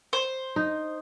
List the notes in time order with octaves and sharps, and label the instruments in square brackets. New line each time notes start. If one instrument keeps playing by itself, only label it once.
[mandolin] C5
[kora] D#4